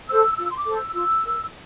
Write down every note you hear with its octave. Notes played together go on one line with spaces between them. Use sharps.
A4 C5 E6
F4 E6
C6
D6
A4 C5
E6
F4 E6
A#4